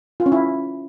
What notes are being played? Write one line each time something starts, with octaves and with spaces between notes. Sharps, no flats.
F4
C#4
E4